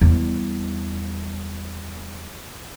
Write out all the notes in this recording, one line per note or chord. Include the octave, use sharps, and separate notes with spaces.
E2 G3